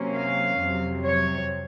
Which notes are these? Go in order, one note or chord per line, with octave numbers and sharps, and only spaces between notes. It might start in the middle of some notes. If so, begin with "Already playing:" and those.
Already playing: C3 F#3 A#3 C#4
F5
F2 C3 F#3
C#5